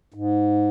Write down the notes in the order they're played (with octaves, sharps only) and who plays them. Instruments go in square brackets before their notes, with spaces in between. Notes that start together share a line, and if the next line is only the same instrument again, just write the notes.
[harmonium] G#2